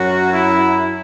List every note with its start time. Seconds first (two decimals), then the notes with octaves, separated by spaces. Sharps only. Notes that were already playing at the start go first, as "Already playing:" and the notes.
Already playing: F#2 F#3 F#4
0.33 E4